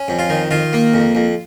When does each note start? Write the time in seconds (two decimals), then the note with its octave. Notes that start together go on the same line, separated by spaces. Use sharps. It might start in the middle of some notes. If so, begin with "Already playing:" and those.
Already playing: C#4
0.08 F2
0.19 F4
0.29 D#3
0.51 D#3 F4
0.73 A#3
0.94 F2
1.15 F2